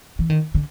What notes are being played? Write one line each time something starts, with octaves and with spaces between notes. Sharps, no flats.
E3
D#3
D3